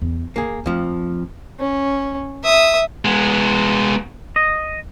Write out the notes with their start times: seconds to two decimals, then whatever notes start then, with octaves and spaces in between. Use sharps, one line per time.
0.01 E2
0.36 D#2 A#3 G#4
0.66 F2 F3 A3
1.59 C#4
2.43 E5 D#6
3.05 G#3 B3
4.36 D#5